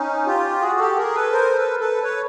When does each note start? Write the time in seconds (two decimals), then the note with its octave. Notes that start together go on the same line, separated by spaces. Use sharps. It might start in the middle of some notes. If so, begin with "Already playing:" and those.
Already playing: C#4 D#4
0.26 F4 G4
0.62 F#4 G#4
0.79 G4 A4
0.97 G#4 A#4
1.15 A4 B4
1.32 A#4 C5
1.56 A4 B4
1.80 A4 B4
2.03 B4 C#5